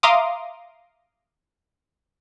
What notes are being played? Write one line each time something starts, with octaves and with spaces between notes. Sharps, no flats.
E5 F5 A#5 C6 D6 D#6